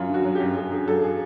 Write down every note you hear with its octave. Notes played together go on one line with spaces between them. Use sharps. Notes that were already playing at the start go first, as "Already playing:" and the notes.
Already playing: F#2 F4
D3 F#4
F#3
F#2 G4
F#2 G#4
D3 G#4
F#3 A4
G#4